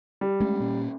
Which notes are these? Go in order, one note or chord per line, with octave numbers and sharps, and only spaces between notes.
G3
G#3 A3 C#4
A#2 A#3 C#4